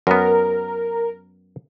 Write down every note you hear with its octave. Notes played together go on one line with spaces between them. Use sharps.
F#2 B3 A#4